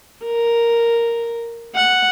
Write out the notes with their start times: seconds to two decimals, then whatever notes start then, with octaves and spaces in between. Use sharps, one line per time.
0.25 A#4
1.75 F#5